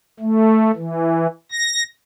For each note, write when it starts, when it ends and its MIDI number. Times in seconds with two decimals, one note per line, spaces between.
0.20 0.71 57
0.76 1.27 52
1.52 1.83 94